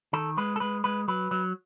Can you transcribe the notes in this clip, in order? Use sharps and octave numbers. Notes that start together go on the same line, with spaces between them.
D#3 A4
G#3 B4
A4
G#3 B4
G#3 B4
F#3 B4
F#3